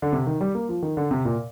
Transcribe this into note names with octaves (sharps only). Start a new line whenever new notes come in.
D3
C3
D#3
G3
A#3
F3
D#3
D3
C3
A#2